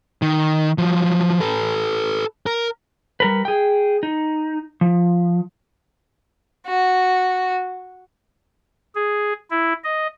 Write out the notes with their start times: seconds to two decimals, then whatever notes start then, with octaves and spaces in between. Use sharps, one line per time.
0.22 D#3
0.78 F3 F#3
1.40 A4 B4
2.46 A#4
3.20 G3 A#4 B4
3.45 G#4 G5
4.03 D#4
4.81 F3
6.67 F#4
8.95 G#4
9.51 E4
9.84 D#5